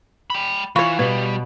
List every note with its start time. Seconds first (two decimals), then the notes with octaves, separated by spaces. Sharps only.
0.30 G5 B5
0.76 E3 F4 C#5 B5 C#6
0.99 B2 G3 B4